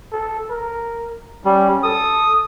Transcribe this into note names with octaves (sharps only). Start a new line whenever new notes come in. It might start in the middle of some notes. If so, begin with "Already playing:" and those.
A4
A#4
G3 C#4
A4 D#6